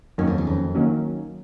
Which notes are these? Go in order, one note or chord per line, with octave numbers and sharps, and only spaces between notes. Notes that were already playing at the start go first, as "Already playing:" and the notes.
F#2 D#3 F#3 A#3 C#4
F2
E2
F2
D#3 F#3 A#3 C#4